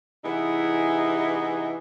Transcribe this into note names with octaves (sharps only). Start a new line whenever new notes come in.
C3 E3 B3 D#4 E4 G#4